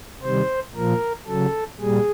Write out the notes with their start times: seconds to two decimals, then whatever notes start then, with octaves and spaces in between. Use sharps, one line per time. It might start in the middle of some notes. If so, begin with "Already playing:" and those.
0.23 C3 D#3 G3 C5
0.75 A#2 F3 A#4
1.27 C#3 F#3 A4
1.80 A#2 G3 G#4